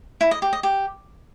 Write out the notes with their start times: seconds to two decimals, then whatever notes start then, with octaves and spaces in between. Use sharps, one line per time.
0.21 E4
0.31 D#5
0.42 G4
0.53 D#5
0.63 G4